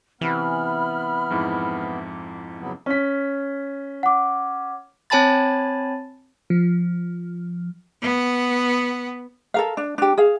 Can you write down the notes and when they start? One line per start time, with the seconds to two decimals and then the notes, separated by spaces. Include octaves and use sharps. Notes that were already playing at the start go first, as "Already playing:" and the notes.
0.21 C3 E3 B3 B5 F6
1.30 F2 G#2 E4
2.60 C#3 F#3 B3
2.86 C#4 B6
4.03 F#5 D6
5.10 C4 C#5 G#5 A5 B5 A6
6.50 F3
8.01 B3 F#5
9.54 A4 A#4 F5
9.77 D4
9.98 D4 G4
10.17 G#4 F5